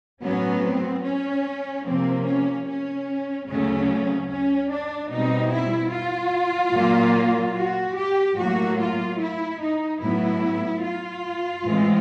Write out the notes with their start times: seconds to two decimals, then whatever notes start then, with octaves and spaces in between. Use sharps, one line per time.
0.22 A2 F#3 B3 C#4
0.63 C4
1.03 C#4
1.85 C3 F3 A#3 C4
2.26 C#4
2.67 C#4
3.48 D2 C#3 F#3 A3 C#4
4.29 C#4
4.70 D4
5.10 B2 G3 C4 D#4
5.51 E4
5.92 F4
6.74 A#2 F#3 A#3
7.55 F#4
7.95 G4
8.36 A2 F#3 A#3 F#4
8.77 F4
9.18 E4
9.59 D#4
9.99 A2 F#3 B3 E4
10.81 F4
11.62 A2 E3 G#3 C4